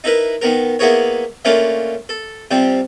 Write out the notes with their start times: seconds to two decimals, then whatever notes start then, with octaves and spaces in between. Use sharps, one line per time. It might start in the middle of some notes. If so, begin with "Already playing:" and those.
0.04 D#4 E4 A#4 B4
0.41 D#3 B3 A#4
0.79 A#3 B3 E4 G#4 A#4 C#5
1.45 A3 A#3 C#4 D4 F4 F5
2.09 A4
2.51 C3 F3 G3 C4